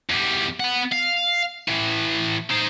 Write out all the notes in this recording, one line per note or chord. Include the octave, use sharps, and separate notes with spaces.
E2 G3
B3 F#5
F5
A2 E3
D#4 C5